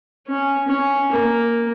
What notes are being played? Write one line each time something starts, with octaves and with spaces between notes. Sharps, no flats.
C#4
C#4
A#3